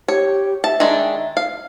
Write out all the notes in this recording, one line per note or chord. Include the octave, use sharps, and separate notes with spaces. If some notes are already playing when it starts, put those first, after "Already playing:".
G4 C#5
E5 A5
D#3 G#3 D4
F5